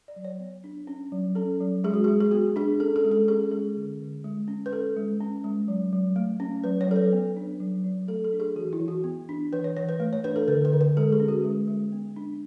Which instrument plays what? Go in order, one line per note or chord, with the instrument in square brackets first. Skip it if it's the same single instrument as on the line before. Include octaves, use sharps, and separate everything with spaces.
[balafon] D5
F#3
C#5
B3
D4
C#4
F#3
C#4 A4
F#3
G#3 G#4
F#4
G#4
G#3
G#4
B3 F#4
D4 G#4
C#4 A4
A4
G#3
A4
C#4 G#4
G#3 G#4
D3
D3
G#3
C#4
B4
C#4 A4
G#3
C#4
G#3
F#3
F#3
A3
C#4
F#3 B4
C#5
F#3 A4
B4
B3
D4
F#3
F#3
A3 A4
A4
D4
G#4
E3 F#4
E4
E3
F#4
B3
D4
E3 B4
C#5
E3 C#5
B4
A3
C#5
D4 B4
A4
D3 B4
B4
D3
B4
G#3 A4
G#4
C#4
F#4
G#3
G#3
B3
D4